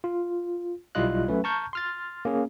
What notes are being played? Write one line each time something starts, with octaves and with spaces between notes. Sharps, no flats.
F4
B1 G3 E4 F4 D#5 F#6
F#3 A3 C#4 B4
A5 A#5 C#6 F6 G6
C6 F6 A6
A#3 C#4 G#4